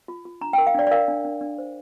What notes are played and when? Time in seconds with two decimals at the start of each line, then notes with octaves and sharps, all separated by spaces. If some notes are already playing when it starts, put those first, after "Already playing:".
0.08 F4
0.25 F4
0.41 D4 A#5
0.53 A#4 G5
0.67 F5
0.74 D4 D5
0.87 D5
0.91 A#4 F5
1.08 D4
1.25 D4
1.41 D4
1.58 C5